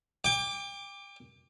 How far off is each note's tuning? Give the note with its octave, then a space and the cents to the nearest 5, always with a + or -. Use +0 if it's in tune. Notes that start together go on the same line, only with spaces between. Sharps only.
G5 +35 D6 +0